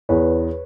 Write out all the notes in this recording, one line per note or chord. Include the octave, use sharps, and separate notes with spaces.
E2 B4 C#5